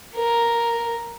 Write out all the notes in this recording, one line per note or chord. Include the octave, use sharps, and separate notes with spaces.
A#4